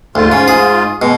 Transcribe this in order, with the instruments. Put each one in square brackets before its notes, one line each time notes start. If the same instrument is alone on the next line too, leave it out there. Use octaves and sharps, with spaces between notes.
[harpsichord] D2 [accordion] G#2 F4
[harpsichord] C#3
G#4
[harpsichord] B2 [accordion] G#3